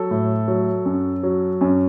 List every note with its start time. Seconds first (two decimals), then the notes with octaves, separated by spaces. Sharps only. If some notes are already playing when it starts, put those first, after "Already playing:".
Already playing: F#3 A4
0.11 A2
0.48 F#3
0.86 F#2
1.23 F#3
1.61 F#2